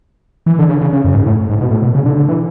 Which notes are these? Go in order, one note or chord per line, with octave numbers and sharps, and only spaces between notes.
E3
D3
C#3
C#3
C#3
F#2
G#2
A2
G#2
B2
A2
B2
C#3
D3
D3
E3